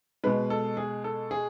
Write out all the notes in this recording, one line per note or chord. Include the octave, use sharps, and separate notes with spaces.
B2 G#3 B4
A4
G#4
A4
G#4